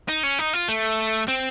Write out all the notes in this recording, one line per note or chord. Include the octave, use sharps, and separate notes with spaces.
D#4
C#4
D#4
F4
A3
C4